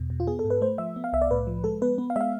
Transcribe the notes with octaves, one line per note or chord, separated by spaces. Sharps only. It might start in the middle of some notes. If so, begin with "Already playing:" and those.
Already playing: E2 B2
B2
F4
B3 G#4
A4
G#2
B4
A3 C5
F3 E5
B3
F5
C2 E5
D5
A2 B4
F3
G#3 A4
B3 B4
B3
F5
G#3 E5 F5